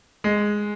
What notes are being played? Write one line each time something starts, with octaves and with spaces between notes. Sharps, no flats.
G#3